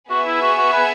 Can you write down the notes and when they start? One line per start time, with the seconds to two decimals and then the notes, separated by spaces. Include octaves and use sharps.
0.10 B3 F#4 G#4 E5 G#5
0.26 E4
0.42 F#4
0.58 F#4
0.73 B4